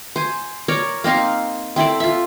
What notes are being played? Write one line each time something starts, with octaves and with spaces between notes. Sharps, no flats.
C5 G#5
A#4 C#5 D5
A#3 C4 D#4 F5
C4 E4 A4 D5
F4 E5